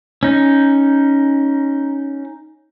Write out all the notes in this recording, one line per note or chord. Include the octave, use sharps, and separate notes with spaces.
C#4 D#4